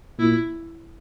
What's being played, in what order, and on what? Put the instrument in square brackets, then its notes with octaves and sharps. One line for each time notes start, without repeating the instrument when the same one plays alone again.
[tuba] A#2 [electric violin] E4